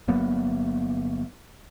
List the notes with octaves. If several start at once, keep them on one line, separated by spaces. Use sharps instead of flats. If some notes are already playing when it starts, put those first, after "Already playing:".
G1 F#3 A#3 B3